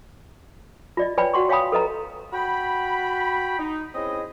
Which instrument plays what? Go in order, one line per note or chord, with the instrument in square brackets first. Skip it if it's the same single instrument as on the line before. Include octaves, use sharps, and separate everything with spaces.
[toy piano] F4 D5 D#5
B4 C#5 D5 G5 G#5 B5
F#4 F#5 C6 C#6
C#5 F5 G5 G#5 B5 D#6
A4 B4 D#5 A#5
[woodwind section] F#4 G5 B5
D#4
C4 C#4 E4 G#4 D#5